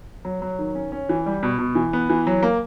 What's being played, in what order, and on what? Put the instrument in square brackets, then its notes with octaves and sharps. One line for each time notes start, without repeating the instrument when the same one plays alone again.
[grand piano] F#3
F#3
D#3
C#4
C#4
E3
G3
B2
B2
E3
B3
E3
F#3
A#3